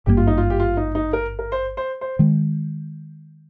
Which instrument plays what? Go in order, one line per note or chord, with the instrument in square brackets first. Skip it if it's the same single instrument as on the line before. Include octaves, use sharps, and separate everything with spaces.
[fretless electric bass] G#1 G2 D#3 A#3 [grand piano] G4
[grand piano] F4
D#4
F4
G4
F4
D#4
D#4
A#4
A#4
C5
C5
C5
[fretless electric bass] D#3 G#3